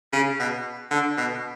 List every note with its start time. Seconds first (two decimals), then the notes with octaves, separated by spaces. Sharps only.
0.13 C#3
0.40 B2
0.91 D3
1.18 B2